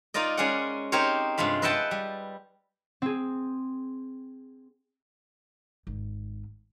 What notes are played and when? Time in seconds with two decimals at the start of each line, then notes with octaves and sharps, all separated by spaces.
0.14 D#4 F4 A#4 D5 D#5
0.37 G#3 C#4 G#4 A#4 D5 F#5
0.92 C4 D#4 G4 A#4 C5 C#5
1.38 G2 C3 G#3 F4 B5
1.62 B4 D#5 E5 F#5 G5 A5
1.91 G3
3.02 C4 G#4
5.87 G#1